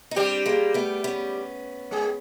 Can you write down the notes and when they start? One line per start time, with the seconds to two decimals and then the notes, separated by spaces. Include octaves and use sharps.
0.11 D#4
0.16 G3 C4 D4 G4
0.46 G#3 A#3
0.74 A3 B3
1.04 B3 C#4
1.91 G#3 G#4